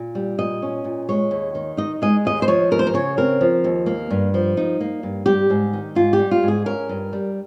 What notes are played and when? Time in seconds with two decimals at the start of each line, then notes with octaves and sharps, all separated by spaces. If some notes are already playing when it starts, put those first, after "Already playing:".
Already playing: A#2
0.15 G3
0.38 A#2 D#5
0.62 C#4
0.84 A#2
1.09 G#3 C#5
1.31 D#2
1.55 D#3
1.77 D#4 D#5
2.02 G#3 D#5
2.25 D#2 D#5
2.42 C5
2.48 F3 C#5
2.71 D#2 A#4
2.79 C5
2.87 A#4
2.93 C#3 C#5
3.17 C4 A#4
3.41 F3
3.64 D#2
3.86 A#3
4.10 G2
4.34 F3
4.57 D#4
4.80 A#3
5.03 G2
5.26 G3 G4
5.50 G#2
5.73 D#3
5.95 G#2 F4
6.13 G4
6.19 G3
6.31 F4
6.43 G#2
6.48 G#4
6.66 C#4 A#4
6.89 G2
7.13 G3